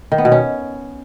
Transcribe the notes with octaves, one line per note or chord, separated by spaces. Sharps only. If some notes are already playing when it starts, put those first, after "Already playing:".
D#3
B3
B2
C#4